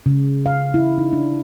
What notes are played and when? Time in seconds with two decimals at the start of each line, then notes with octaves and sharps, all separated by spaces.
0.06 C#3
0.46 F5
0.74 E4
0.98 D#4
1.13 D4